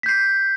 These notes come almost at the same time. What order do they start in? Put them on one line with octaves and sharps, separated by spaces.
B6 G6 C7